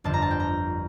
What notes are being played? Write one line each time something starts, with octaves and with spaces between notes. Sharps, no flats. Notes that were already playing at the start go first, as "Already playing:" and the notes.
G1 F2 D3 A5
A#5
A5
G5
A#5